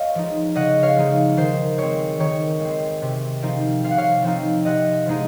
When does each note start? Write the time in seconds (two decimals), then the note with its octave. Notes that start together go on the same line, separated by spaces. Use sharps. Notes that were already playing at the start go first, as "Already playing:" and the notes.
Already playing: C#5 D#5 F5
0.15 F3 G#3 D#4
0.56 C#3 D#5 F#5
0.83 C#5 F5
0.97 F3 G#3 D#4
1.37 D#3 C5
1.78 G#3 C4 C#5
2.20 D#3 C#5
2.60 G#3 C4
3.02 C3
3.42 F3 C4 D#4
3.84 C3 F5
3.91 F#5
3.98 C#5 F5
4.22 F3 C4 D#4
4.65 C3 D#5 F#5
5.06 F3 G#3 D#4